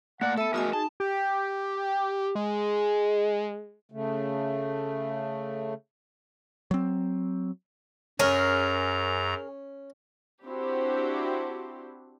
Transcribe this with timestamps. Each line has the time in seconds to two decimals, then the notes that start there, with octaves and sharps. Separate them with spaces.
0.21 A3 A#3 D5 F#5
0.38 B3 A4 E5 A5
0.54 A3 F#4 G#4 A#4 D#5 G#5
0.73 D#4 G#4 A5
1.00 G4
2.35 G#3
3.92 C#3 A3
6.71 F#3 C4
8.20 F#2 C#4 G#4 A#4 A#5
10.44 C4 D4 E4 F#4 G4 C5